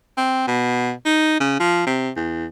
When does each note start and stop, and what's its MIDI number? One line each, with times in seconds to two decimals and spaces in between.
0.17 0.47 60
0.47 0.93 47
1.05 1.37 63
1.40 1.56 49
1.60 1.86 53
1.87 2.10 48
2.16 2.46 40